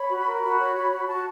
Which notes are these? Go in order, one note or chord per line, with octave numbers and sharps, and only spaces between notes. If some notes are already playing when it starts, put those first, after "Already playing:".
Already playing: C#5 B5
F#4
A#4
F#4 B5
C#5
F#4
F#4
F#4 A5